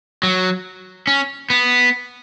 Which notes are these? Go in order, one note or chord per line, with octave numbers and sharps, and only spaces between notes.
F#3
C#4
B3